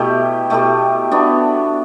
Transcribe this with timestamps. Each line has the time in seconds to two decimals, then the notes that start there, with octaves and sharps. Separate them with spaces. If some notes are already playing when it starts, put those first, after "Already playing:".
Already playing: B2 A3 E4 G4
0.50 B2 A3 E4 G4
1.11 B3 D4 F#4